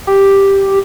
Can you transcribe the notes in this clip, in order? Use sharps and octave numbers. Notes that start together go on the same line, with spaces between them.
G4